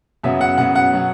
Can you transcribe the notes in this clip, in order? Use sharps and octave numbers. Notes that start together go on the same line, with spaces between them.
F#2 C#3 F#3 B3 E5
F#5
F#2 C#3 F#3 B3 F#5
F#5
B2 F#3 B3